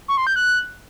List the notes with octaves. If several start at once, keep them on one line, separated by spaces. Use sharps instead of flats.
C#6
C6
G6
F#6